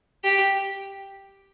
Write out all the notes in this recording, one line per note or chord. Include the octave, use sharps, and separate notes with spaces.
G4